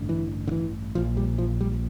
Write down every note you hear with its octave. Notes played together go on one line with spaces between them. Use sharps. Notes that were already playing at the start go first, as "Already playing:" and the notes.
Already playing: A1 G2 D3
E3
D3
E3
A#1 A#2 F3
G3
F3
G3